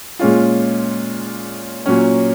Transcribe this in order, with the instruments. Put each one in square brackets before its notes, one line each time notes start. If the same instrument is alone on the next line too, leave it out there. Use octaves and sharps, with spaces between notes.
[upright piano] A#2 G#3 C#4 F4
A#2 F#3 C#4